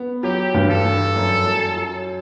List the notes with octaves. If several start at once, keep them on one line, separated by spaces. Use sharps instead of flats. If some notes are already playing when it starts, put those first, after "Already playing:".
Already playing: B3
F#3 G4
G2
A4
G2
F#2
F#2
F#3